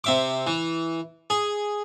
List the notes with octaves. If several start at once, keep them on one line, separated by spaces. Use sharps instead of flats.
C3 E5 D6
E3
G#4